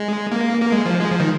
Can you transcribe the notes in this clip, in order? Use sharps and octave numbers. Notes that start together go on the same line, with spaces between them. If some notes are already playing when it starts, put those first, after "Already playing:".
Already playing: G#3
A#3
A#3
G#3
F3
G#3
F3
D#3